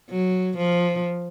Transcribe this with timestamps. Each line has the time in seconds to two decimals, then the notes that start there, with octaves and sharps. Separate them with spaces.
0.10 F#3
0.58 F3